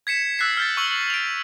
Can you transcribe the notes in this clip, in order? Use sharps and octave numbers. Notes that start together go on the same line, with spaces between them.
G#6 B6 C#7 E7
E6 F#6 A6 B6 C7
F6 G6 A6
C#6 E6 F#7
D7 F7